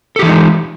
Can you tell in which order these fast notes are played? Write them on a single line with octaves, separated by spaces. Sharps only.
A4 G4 E3 D#4 G#3